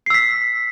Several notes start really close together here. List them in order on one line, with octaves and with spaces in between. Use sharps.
C7 E6 B6